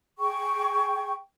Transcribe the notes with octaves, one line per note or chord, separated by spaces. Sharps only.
G#4 G5 C#6